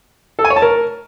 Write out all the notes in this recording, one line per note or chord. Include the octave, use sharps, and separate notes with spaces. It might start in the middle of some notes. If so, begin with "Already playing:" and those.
A4
G#5
C#5
A5
A#4